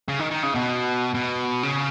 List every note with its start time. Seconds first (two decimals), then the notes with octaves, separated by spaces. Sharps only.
0.08 C#3
0.19 D#3
0.31 D#3
0.43 C#3
0.55 B2
1.15 B2
1.63 C#3